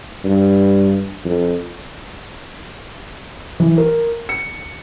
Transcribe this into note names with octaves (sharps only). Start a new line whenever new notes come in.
G2
F2
E3
A#4
C#7